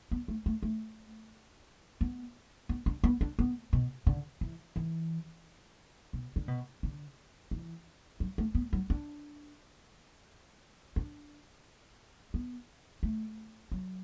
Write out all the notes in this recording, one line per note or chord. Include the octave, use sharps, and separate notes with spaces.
B3
A3
A3
A3
B3
B3
D4
B3
D4
B3
B2
D3
E3
E3
B2
D3
B2
D3
E3
F#3
A3
B3
F#3
D4
D4
B3
A3
F#3